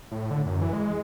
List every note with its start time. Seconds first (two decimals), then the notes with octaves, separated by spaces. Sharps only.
0.11 A2
0.31 D3
0.46 F#2
0.61 E3
0.73 G#3